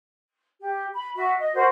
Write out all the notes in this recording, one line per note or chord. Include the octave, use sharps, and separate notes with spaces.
G4
B5
F#4 E5
D#5
F#4 A#4 C5